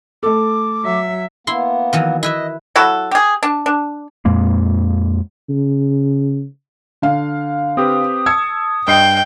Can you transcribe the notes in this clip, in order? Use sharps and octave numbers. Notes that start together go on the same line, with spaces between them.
A3 A4 D6
F#3 E5
A#3 B3 E4 C6
D#3 E3 F#3
E4 B4 D#5 E5
F#3 E4 F#4 A4
G4 G#4
D4
D4
F2 A#2 G#3 A#3
C#3
D3 F5
C4 G4 B4 D#6
A5 E6 G#6 C#7
G2 D#5 G5 C7